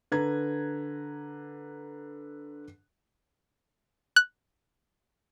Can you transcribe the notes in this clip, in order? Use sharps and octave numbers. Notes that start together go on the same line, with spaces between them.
D3 B4 A#5 G#6
F#6